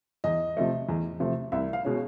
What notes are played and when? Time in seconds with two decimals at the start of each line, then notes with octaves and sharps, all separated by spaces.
0.24 E2 D#5
0.57 C3 F3 A3
0.89 E2
1.20 C3 F3 A3
1.52 C2 E5
1.73 F5
1.85 B2 G#3 C#4